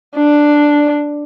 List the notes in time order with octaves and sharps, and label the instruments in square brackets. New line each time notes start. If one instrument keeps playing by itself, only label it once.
[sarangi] D4